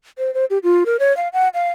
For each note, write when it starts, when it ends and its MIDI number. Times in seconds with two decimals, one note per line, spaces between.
0.18 0.33 72
0.34 0.45 72
0.50 0.58 67
0.63 0.84 65
0.86 0.97 70
1.00 1.15 73
1.17 1.28 77
1.33 1.49 78
1.54 1.71 77